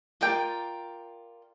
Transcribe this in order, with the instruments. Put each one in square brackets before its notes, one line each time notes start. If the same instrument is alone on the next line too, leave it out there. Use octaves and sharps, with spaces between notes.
[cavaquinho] F4 A#4 D5 G5